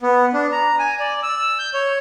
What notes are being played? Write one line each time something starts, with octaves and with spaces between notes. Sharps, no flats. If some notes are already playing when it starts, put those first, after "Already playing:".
B3
D4
A#5
G#5
D5
E6
G6
C#5